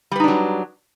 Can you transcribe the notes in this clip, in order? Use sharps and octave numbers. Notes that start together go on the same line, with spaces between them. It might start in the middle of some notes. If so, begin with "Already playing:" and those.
F#3 G3 D4 D#4 B4